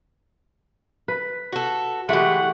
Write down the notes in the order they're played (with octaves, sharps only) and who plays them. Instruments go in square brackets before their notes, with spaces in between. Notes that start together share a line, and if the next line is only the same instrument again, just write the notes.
[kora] B4
[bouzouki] F#4 A4
[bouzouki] E3 G#3 [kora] A3 F#4 G4 [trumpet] F#5